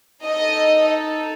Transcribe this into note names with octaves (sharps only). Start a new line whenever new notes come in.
D#4 A4 D#5